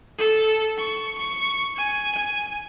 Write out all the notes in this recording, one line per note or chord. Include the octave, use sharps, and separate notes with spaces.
A4
C#6
C#6
G#5
G#5